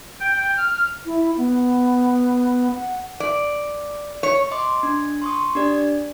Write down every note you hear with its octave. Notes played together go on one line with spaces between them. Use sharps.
G5
F6
E4
B3
F#5
D5
C#5
D#5 C6 D6
D4
C6 C#6 D#6
D4 G4 D5